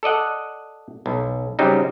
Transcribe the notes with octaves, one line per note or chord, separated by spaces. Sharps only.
A4 D5 D#5 F#5
B1
C#3 F#3 G3 C4 D#4